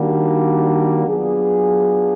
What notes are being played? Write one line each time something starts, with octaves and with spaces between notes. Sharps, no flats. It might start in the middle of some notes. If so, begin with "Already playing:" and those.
Already playing: D#3 G3 A#3 D4 F#4
F#3 B3 D4 F4 G#4